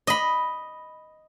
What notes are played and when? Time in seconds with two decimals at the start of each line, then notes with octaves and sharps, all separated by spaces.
0.07 D#5 B5